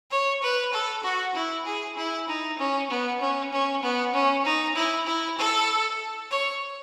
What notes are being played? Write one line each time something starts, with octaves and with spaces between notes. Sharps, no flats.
C#5
B4
A4
F#4
E4
G#4
E4
D#4
C#4
B3
C#4
C#4
B3
C#4
D#4
E4
E4
A4
C#5